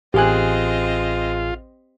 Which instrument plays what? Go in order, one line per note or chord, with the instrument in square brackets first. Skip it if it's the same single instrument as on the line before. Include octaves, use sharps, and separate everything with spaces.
[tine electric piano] A1 G#4 F#6 [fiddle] C4 D#5 [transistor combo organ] F4 [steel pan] G4 G#5